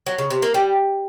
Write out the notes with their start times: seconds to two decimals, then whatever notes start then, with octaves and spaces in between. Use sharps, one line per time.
0.07 F#3
0.18 C#3
0.30 C3
0.42 A#3
0.54 G3